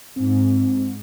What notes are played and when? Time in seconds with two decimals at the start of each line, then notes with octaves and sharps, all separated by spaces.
0.17 G#2 C4